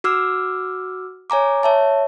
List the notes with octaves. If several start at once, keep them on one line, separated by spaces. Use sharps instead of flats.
F#4 D6 E6 F6
C#5 G#5 A#5 D6
C#5 E5 A5